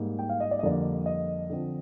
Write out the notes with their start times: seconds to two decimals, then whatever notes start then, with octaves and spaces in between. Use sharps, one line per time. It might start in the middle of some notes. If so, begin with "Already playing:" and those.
Already playing: G#2 G3 A#3
0.19 G5
0.29 F5
0.40 D#5
0.51 D5
0.59 D#5
0.63 F2 D3 G3 A#3 D5
1.06 D#5
1.50 D3 F3 C4